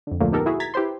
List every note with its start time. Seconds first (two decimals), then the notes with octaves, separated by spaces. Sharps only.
0.07 F2 D3
0.20 D2 A#2 D3 F3 A3 A#3
0.32 B3 D#4 G4 A4 A#4
0.46 E4 F#4 G#4 E5
0.60 A#5 G#6 A6 B6
0.74 E4 G4 B4 C5 C6